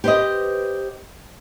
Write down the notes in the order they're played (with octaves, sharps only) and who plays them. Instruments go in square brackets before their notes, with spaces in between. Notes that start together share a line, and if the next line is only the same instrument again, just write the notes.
[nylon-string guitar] G4 B4 C5 D#5